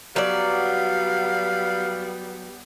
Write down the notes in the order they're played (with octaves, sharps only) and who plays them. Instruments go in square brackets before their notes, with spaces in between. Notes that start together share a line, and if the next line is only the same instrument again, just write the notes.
[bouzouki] F#3 D5 [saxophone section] G3 B3 [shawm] F5